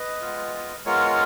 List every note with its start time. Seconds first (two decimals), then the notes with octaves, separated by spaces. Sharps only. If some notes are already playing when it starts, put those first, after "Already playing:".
Already playing: B4 D#5
0.21 G#3 B3 F4
0.85 G#3 B3 F4 A#4 C#5